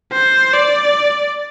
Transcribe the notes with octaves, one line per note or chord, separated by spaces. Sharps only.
C5
D5